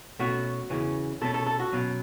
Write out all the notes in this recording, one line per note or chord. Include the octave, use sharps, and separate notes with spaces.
B2 A3 C#4 F#4
E2 C#3 E3 C#4
B2 A3 C#4 A4
A4
A4
F#4
B2 F#3 C#4